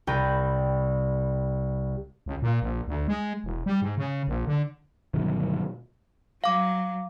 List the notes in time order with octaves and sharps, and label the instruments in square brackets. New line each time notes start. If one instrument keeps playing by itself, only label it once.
[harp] C2 G5 B5 A#6 D#7
[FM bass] C#2
A#2
A#1
D2
G#3
E1
G3
G#2
C#3
A#1
D3
[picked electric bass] G1 B2 D#3 F#3
[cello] F#3 [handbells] F5 D6